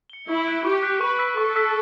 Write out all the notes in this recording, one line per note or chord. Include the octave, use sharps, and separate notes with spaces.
C#7 G7
E4 C#6
F#6 B6 D7
G4 C#6
F#6 B6 D7
B4 C#6
E6 B6
A4 C#6
E6 B6